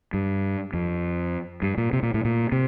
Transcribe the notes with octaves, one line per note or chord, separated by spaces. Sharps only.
G2
F2
G2
A#2
C3
A#2
A2
A#2
C3